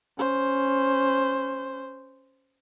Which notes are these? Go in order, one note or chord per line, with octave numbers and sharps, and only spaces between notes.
C#4 C5